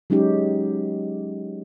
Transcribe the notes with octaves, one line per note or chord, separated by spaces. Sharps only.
F#3 G#3 C#4 D#4 G4